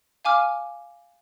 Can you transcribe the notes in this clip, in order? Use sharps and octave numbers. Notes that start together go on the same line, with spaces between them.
F5 G#5 D6 F6